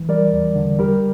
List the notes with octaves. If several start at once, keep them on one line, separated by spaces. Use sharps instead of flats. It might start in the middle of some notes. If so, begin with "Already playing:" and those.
Already playing: E3
G3 A#4 D5
E2
D3
G3 G4 A#4